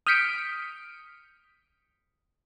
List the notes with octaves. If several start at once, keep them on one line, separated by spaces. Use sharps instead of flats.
D#6 F6 G6 B6 C#7 D7